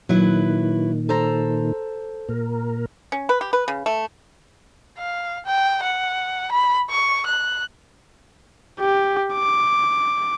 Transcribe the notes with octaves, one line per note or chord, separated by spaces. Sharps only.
A#2 D#3 F#3 E4 B4
A4 C5 A#5
A#2 A#4
C#4
B4
G4
B4
C#3
A3
F5
G5
F#5
B5
C#6
F#6
G4
D6